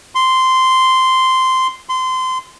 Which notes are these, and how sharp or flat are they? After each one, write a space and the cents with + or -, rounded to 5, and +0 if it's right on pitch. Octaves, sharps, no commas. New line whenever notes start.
C6 -10
C6 -25